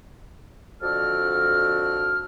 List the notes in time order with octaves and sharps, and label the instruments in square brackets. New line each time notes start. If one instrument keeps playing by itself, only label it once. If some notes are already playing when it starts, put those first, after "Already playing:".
[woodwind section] F2 D3 F#4 A4 D5 F6